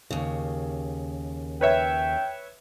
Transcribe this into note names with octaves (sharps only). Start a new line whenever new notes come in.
D#2 C#3
B4 C#5 E5 G5